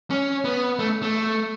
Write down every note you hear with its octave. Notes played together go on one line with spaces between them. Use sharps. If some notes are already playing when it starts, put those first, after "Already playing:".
C#4
B3
A3
A3